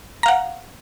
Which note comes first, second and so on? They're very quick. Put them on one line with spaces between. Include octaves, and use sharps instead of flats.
A#5 F5 F#5